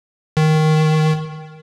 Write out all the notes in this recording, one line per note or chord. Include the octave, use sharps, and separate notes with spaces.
D#3